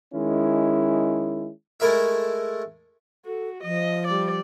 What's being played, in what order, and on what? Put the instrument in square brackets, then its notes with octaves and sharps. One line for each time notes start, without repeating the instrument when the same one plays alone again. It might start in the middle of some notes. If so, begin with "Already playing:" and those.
[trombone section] D#3 G#3 C#4 E4
[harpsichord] G#3 A3 E4 A#4 D#5 E5
[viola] F#4 [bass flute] A4
[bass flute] F3 [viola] D#5
[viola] G3 D5